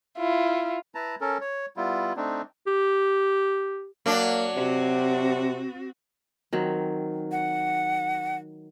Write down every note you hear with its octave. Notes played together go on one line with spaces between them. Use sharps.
E4 F4
E4 B4 A5 A#5
C#4 A4 A#4
C#5
G3 B3 E4 F4
A3 C4 D4 D#4
G4
F#3 A#3 D4
C3 C4 F#4
D#3 F#3 C4
F#5